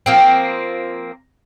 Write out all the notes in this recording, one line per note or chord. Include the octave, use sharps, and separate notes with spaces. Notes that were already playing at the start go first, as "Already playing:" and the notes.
F3 A#3 C4